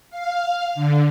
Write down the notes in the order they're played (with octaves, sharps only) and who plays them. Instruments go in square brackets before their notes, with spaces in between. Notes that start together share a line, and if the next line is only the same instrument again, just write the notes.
[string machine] F5
D3